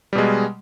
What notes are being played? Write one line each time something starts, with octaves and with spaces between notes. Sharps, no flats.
B2 G3 G#3